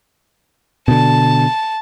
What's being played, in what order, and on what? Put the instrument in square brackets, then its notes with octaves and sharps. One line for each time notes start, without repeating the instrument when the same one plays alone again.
[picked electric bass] B2 D3 [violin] A5